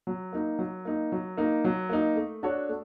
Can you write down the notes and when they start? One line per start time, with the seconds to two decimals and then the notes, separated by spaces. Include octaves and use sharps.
0.07 F#3
0.33 A#3 D#4
0.59 F#3
0.85 A#3 D#4
1.12 F#3
1.37 A#3 D#4
1.65 F#3
1.90 A#3 D#4
2.16 A3
2.43 D4 F#4 A4 C#5
2.69 A3